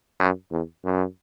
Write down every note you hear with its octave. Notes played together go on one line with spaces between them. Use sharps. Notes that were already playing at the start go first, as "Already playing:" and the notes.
F#2
E2
F#2